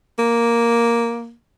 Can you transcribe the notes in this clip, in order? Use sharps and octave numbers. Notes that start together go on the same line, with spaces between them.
A#3